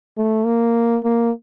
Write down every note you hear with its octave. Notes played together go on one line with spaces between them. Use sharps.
A3
A#3
A#3